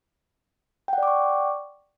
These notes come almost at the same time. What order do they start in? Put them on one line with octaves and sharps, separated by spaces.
G5 F#5 D5 D6 C#6